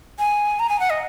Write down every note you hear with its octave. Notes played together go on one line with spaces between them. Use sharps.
G#5
A#5
G#5
F#5
D#5